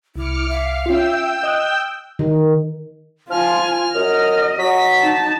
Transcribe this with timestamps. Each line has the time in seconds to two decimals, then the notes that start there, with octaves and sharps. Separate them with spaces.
0.16 C2 E4 D6 F6 C#7
0.48 E5 F5
0.86 C#4 F4 G5 E6 G6
1.43 D#5 D#6 F#6
2.19 D#3
3.30 F3 F4 G#5 F6
3.94 F#2 D#5
4.58 F#3 B6
5.02 D#4 A5